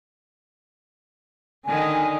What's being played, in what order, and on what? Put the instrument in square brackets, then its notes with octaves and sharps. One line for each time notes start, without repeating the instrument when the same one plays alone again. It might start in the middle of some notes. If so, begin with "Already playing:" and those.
[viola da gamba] D3 D#3 D#4 [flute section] G#5